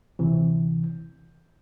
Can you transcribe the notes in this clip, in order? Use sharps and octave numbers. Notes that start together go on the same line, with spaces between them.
D2 C3 E3